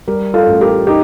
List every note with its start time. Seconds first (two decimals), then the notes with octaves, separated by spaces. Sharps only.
0.07 G3 G4 A#4
0.34 F4 A4
0.47 A1
0.61 G4 A#4
0.87 D#4 G4